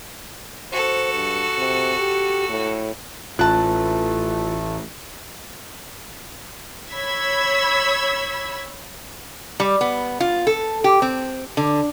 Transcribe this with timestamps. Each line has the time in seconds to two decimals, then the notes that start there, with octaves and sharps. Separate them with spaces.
0.72 F#4 A4 C5
1.13 G2
1.57 C3
2.00 G4
2.50 A2
3.39 A1 A3 F4 A5 F#6
6.90 C#5 B5 E6 G#6 B6
9.60 G3
9.81 B3
10.20 F4
10.47 A4
10.84 G4
11.02 C4
11.57 D3